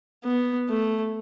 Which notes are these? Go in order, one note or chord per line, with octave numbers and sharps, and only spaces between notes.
B3
A3